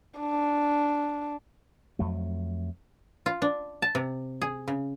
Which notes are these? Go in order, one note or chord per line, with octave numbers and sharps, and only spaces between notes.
D4
F2 F#3 A3
F4
D4
A5
C3
G#4
C#3